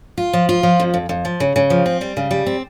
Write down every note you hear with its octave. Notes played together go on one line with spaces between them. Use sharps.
F4
F3
F4
F3
F2
F2
F2
F3
C#3
C#3
F3
C4
G3
C#3
G3
C4